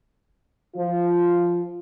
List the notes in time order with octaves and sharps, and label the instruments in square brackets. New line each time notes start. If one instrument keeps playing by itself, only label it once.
[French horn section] F3 F4